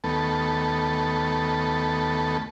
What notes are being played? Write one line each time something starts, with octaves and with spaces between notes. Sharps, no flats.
D#2 A3 B3 A4